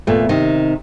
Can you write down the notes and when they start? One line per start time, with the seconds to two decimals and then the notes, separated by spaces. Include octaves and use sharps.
0.07 E2 A#2 A3
0.29 C3 D#3